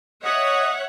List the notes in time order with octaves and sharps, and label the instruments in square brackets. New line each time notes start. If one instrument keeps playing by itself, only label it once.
[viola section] C#5 E5 F#5 [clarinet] D#5